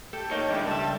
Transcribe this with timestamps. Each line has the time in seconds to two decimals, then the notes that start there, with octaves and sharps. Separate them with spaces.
0.13 A3 G4 A4
0.31 A#3 D#4 C#5 G5
0.50 G2 D#3 G#3 D4 E4
0.67 C#2 G3 A3 A4 E5